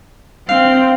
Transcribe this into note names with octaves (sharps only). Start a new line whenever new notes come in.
C4 F5